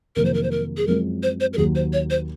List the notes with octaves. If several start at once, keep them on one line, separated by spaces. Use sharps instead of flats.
F2 C3 D#3 F#3 A#3 A#4
C5
A#4
C5
A#4
G#4
F#2 F3 G#3 C4 A#4
C5
C5
A#4
D#2 D#3 F#3 G#4
C5
C#5
C5